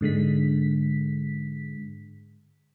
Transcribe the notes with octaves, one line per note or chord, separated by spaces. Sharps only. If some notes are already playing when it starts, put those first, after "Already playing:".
G#2 D3 G#3 B6